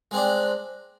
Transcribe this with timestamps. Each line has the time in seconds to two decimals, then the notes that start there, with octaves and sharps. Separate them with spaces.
0.11 G#3
0.14 C4
0.16 D4